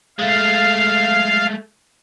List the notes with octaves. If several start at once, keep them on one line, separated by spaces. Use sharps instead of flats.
G#3 A3 F5